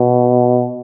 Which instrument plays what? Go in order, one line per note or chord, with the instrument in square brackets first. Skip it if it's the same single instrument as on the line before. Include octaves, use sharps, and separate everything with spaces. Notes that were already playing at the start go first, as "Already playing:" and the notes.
Already playing: [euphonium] B2